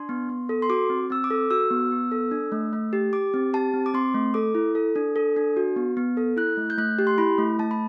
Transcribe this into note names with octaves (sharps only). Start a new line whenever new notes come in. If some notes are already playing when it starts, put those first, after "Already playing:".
Already playing: D4 C6
B3
B3
A4
C6
F#4 D6
C4
C4 E6
D6
A4
F#4 E6
B3
B3
A4
D4
A3
A3
G4
G4 D6
C4
G4 A5
C4
D6
C4 C6
A3
A4 D6
E4
A4
D4
A4
D4
F#4
B3
B3
A4
E4 F#6
A3
G6
A3 F#6
G4
C6
E4 B5
A3
A3 A5
B5